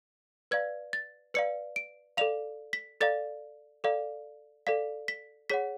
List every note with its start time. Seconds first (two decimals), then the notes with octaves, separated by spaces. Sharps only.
0.51 B4 D5 F5 G#6
0.93 A6
1.34 B4 D5 F5 C#7
1.76 D7
2.17 A4 D5 F5 F7
2.73 B6
3.01 A4 D5 F5 A6
3.84 A4 D5 F5
4.67 A4 D5 F5 B6
5.08 B6
5.50 G#4 C#5 F#5 B6